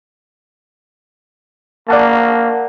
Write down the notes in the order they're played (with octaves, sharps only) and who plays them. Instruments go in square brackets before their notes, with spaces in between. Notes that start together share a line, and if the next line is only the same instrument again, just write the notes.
[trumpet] A#3 [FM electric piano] D5 F#5 A5